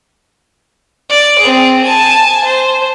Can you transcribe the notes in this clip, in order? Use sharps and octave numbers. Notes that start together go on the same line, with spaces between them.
D5
C4 G#4
G#5 A5
C5